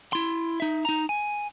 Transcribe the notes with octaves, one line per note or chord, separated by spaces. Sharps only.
E4 C6
D#4 E5
D#4 A#5
G#5